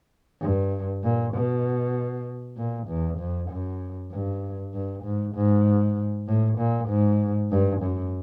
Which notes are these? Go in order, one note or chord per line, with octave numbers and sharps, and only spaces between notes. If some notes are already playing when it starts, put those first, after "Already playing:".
G2
A#2
B2
A#2
E2
F2
F#2
G2
G2
G#2
G#2
A2
A#2
G#2
G2
F#2